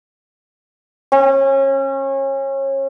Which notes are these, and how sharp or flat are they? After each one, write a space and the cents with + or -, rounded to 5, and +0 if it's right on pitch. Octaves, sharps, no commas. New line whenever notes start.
C#4 -30